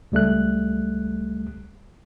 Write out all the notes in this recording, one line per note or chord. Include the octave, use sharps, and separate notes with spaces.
C#2 G3 A3 F#6